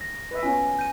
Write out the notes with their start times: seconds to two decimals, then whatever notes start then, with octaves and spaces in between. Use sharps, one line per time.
0.01 A#6
0.31 B4 D#5 E5
0.43 B3 C#4 F4 G#5
0.79 G6 D#7